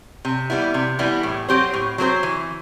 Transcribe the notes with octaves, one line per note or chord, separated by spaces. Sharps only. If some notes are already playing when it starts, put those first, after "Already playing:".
C3
E3 G3 B3 E4
C3
E3 G3 B3 E4
A2
F#3 C4 G4 C5
A2
F#3 C4 G4 C5
E3